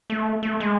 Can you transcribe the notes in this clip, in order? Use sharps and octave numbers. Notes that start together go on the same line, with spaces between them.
A3
A3
G#3